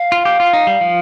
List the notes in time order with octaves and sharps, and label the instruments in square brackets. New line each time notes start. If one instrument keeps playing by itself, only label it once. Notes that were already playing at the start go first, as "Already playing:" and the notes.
Already playing: [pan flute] F5
[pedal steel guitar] F4
G4
F4
D#4
G3
F3